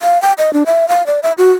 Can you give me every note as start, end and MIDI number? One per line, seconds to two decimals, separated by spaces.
0.02 0.20 77
0.22 0.33 79
0.38 0.53 75
0.53 0.63 62
0.66 0.88 76
0.88 1.05 77
1.07 1.20 74
1.23 1.32 76
1.38 1.50 66